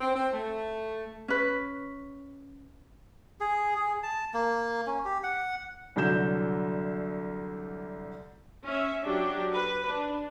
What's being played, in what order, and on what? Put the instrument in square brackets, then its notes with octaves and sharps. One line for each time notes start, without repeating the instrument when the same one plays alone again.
[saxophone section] C4
C4
A3
[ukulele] C#4 B4
[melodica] G#4
G#4
A5
A#3
C#4
G4
F#5
[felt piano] C2 D3 F#3 G6 E7
[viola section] C#4 E5
F#3 D4 G4
B4
D4